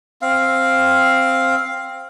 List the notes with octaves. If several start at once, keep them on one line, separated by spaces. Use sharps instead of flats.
C4 F5